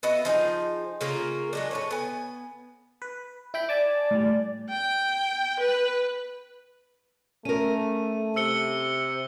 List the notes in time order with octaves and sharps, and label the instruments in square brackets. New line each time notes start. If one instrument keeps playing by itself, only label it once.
[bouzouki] B3 F#4 D#5 E5
F3 D#4 G#4 G5
C#3 A#3 F4 A#4
F#3 G#3 D4
A2 B4 C#5
B3 G#5
[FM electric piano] B4
E4 G5 B5
[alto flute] D5 [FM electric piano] G#5 A5 D6
[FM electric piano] A2 G3
[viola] G5
B4
[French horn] A3 [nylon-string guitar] C#4 A#4 [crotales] D#7
[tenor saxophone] C3 [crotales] E6 C#7 G7